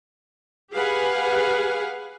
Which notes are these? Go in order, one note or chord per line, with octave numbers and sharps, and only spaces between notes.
G4 G#4 B4 F5 F#5 G#5